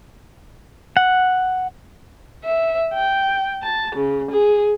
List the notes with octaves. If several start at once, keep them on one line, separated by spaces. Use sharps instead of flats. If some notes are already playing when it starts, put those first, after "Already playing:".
F#5
E5
G5
A5
C#3
G#4